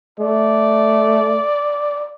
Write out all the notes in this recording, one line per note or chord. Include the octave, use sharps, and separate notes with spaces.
A3 D5